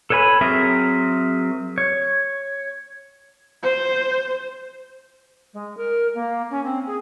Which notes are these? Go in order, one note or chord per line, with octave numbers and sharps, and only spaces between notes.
A4 B4 C#5 G#5 B5
F#3 C4 G#4 A#4 E5
C#5
C5
G#3
A#4
A#3
C#4
C4
G#4